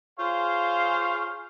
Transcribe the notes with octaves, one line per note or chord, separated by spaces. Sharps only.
F4 G#4 C5 C#5 F5